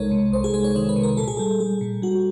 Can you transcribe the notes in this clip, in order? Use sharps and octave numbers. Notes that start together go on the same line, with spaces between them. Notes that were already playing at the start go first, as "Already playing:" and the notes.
Already playing: C2 C3 G#3 D#4 A4 A#4 C#5
C3
C2 C5
G#4
G#3 C5
C#5
D#3 C5
B4
C3
A#4
A#2 A4
G#4
G3 A4
G3 G#4
A#2
G3 F#4